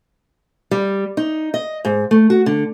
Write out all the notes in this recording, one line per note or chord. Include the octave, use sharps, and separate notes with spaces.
G3
D#4
D#5
G#2
A3
F#4
D3